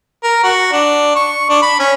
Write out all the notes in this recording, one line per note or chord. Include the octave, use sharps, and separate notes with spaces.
A#4
F#4
D4
C#6
D4
B5
C#4